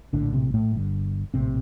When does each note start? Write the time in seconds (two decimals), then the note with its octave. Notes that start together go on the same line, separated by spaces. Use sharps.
0.13 A#1 A2 D3 D4
0.33 C3 C4
0.54 A2 A3
0.73 G1 G2 D3
1.34 A#1 A2 C3 C4